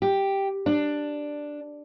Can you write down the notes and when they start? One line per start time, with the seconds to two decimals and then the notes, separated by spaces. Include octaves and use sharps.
0.02 G4
0.66 D4